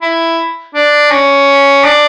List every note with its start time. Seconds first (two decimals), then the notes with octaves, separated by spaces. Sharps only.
0.02 E4
0.75 D4
1.11 C#4
1.84 D4